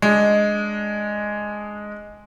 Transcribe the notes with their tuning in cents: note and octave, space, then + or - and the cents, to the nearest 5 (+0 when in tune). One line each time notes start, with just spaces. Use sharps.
G#3 +0 D4 +0